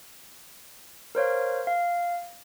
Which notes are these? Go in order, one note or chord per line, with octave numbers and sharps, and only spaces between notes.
A#4 C5 C#5 F5
F5